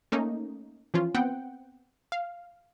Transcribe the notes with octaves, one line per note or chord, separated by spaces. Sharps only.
A3 A#3 C#4 D#4
E3 F3 C#4 F4
B3 C4 F#5 G5
F5